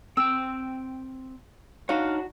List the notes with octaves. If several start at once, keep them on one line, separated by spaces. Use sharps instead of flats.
C4 G5 E6
D4 D#4 F#4 C#5 F5